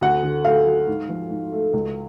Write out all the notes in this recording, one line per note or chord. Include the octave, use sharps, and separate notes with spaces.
D2 F#5
D3
A3 F5
F#3
G#2
F3
G#2
A3
C#2